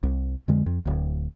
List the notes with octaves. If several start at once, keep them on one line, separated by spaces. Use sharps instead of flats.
C2
F2 D3 G#3
F2
D1 D2